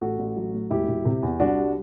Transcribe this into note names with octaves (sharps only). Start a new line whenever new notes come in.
A1 F#4 A4
A1
F#3
A2
E1 E4 G4
E1
C3
E2
C2 D4 F#4
G3